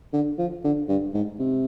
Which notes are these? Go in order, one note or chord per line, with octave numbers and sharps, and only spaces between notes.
D3
F3
D3
G2
G#2
C3